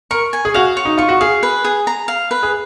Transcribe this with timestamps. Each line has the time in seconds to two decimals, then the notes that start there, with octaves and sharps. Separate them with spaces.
0.11 A#4 C#6
0.33 G#5
0.45 G#4
0.54 F#4 F5
0.77 C#5
0.85 D#4
0.98 F4 C#6
1.09 F#4
1.21 G#4 F5
1.43 B4
1.64 G#4
1.87 A#5
2.08 F5
2.31 B4
2.43 G#4